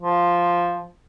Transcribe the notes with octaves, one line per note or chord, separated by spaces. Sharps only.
F3